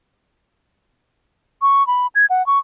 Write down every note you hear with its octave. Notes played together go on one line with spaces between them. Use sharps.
C#6
B5
G#6
F#5
C#6